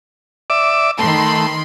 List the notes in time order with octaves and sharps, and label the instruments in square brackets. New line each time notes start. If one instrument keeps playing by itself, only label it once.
[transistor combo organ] D5 E5 D6
[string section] D#3 B5 C6 [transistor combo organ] A3